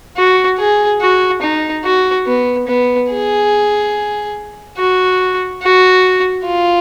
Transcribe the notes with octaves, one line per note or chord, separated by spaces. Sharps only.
F#4
G#4
F#4
D#4
F#4
B3
B3
G#4
F#4
F#4
F4